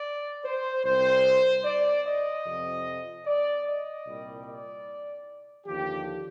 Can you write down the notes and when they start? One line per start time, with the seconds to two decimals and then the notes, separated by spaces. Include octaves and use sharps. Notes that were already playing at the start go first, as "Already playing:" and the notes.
Already playing: D5
0.45 C5
0.84 C2 C3 G3 C5
1.64 D5
2.05 D#5
2.45 F2 C3 F3
3.26 D5
3.65 D#5
4.06 C2 A#2 G3
4.46 D5
5.65 D#2 D3 F3 G4